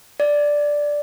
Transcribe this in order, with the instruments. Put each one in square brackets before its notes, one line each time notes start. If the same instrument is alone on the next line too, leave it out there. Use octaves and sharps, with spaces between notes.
[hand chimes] D5